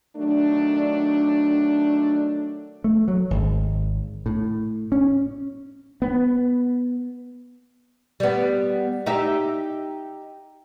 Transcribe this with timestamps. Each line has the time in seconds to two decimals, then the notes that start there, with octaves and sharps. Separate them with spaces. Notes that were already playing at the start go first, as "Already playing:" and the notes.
0.16 D#3 F#3 A3 D4
2.84 A3
3.08 F#3
3.31 G#1
4.26 A2
4.92 C#4
6.02 B3
8.20 G3 B3
9.06 D#4 G4 E5